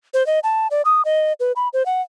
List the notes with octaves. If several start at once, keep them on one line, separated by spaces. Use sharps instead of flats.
C5
D#5
A5
D5
D#6
D#5
B4
B5
C5
F#5